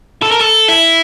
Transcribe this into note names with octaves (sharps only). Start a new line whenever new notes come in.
A4
A#4
A4
E4